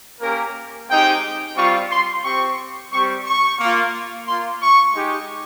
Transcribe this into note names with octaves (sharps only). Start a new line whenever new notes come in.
A#3 C#4 G4 A#4
G#3 C4 D#4 G4 G5
G3 C4 F4 C#6
C6
C4 G4 C#6
G3 C4 G4 C#6
C#6
A#3 F4
A#3 F4 C6
C#6
G#3 D#4 G4